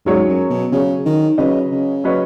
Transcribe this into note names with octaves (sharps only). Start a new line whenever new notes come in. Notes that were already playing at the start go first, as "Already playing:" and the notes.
G#2 F#3 C#4 G#4 C#5
F#2
B2
C#3 F#3 C#4 G#4 C#5
D#3
C#3 F#3 C#4 B4 D#5
C#3
F#3 C#4 B4 D#5